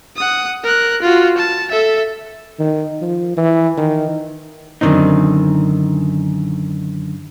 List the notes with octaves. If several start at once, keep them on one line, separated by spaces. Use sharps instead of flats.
F#5 D#6
A#4 F#6
F4 F#4
A5
A4 E5
D#3
F3
E3
D#3
F#2 D3 D#3 C4 D#4